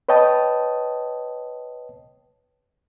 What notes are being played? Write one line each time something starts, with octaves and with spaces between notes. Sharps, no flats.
B4 C#5 D#5 G5 A5 D#6